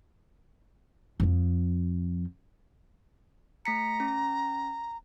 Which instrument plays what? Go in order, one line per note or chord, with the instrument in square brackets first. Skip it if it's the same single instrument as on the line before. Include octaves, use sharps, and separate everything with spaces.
[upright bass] F2 F3
[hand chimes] A3 B6 C#7 [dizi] A#5
[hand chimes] C#4